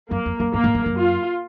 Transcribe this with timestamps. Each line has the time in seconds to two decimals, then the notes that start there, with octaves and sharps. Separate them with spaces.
0.11 F#2 A#3
0.26 F2
0.40 F#2
0.53 G#2 A#3
0.64 G#2
0.75 F#2
0.86 F#2
0.96 F4